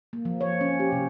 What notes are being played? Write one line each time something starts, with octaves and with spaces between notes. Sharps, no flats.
A#3
F3
C#5
C#4
G4
C3